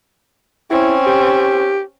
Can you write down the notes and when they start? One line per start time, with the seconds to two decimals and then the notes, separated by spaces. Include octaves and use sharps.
0.70 C4 C#4 E4
1.07 G4